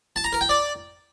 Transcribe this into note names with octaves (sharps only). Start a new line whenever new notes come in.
A5
A#5
A#4
G5
D5